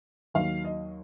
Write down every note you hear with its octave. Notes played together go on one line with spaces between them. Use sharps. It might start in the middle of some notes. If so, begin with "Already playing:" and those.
D#2 D#3 F#3 F5
D#5